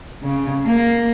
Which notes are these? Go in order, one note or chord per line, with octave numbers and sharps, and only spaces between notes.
C#3
A#3